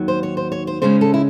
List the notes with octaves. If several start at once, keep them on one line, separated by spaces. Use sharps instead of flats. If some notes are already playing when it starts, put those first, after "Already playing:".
Already playing: D#2 D#3 F#3
C5
C#5
C5
C#5
C5
C#3 G#3 C#4 C5
A4
E4